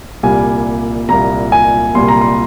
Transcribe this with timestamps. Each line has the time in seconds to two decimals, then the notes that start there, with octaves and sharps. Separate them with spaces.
0.23 C2 A#2 G3 A#3 G#5
1.09 C2 A#2 G3 A#3 A#5
1.52 G#5
1.95 C2 A#2 G3 A#3 C6
2.08 A#5
2.21 C6